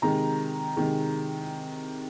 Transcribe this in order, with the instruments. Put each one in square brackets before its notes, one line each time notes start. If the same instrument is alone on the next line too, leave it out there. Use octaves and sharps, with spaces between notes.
[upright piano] C3 D#3 G#3 A#5
C3 D#3 G#3